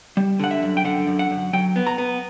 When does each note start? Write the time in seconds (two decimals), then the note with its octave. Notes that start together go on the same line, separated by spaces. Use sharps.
0.17 G3
0.40 D3 F#5
0.51 E5
0.62 F#2
0.77 G5
0.84 D3 F#5
1.07 F#2
1.19 F#5
1.30 F#2
1.53 F#3 G5
1.76 B3
1.87 A#5
1.98 B3